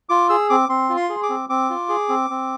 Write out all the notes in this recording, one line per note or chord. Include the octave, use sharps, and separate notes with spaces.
F4 D6
G#4 E6
C4 D6
C4 C6
F4
C6
G#4
D6
C4
C4 D6
F4
G#4
C4
C4